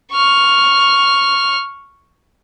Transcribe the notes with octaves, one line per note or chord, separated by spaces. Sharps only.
C#6 F6